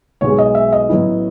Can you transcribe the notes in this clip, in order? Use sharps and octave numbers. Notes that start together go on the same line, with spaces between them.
B1 B2 G#3 C#5
D#5
E5
D#5
A1 A2 F#3 B3 E4